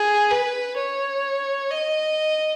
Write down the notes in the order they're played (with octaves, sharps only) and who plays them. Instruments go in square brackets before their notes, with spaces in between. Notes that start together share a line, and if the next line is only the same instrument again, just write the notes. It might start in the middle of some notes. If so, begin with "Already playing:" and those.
Already playing: [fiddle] G#4
B4
C#5
D#5